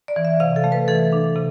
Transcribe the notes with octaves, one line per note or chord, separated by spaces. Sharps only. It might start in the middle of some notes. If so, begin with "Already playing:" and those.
D5
E3
E5
C3 F5
A4
A3
B4
E3 A4
D4
C3